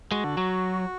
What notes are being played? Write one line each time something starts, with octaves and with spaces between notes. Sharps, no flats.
G#3 F#4
D3
F#3